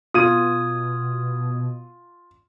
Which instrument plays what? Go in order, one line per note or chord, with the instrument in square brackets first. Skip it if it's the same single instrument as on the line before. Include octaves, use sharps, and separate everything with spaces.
[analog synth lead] B2 [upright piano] F4 D#7 [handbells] D#6 G#6